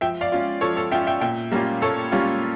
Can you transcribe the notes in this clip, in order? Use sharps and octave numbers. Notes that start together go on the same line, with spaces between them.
F3 E5 G5
D5 F5
C#4 F4
F3 A4 C#5
A4 C#5
C#4 F4 E5 G5
E5 G5
A#2 E5 G5
G3 A#3 C#4 F4
A#2 A4 C#5
G3 A#3 C#4 F4